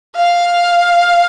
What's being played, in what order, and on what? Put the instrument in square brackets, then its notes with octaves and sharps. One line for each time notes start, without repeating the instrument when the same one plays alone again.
[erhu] F5